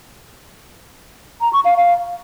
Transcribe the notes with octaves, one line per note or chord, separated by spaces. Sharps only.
A#5
C#6
F5
F5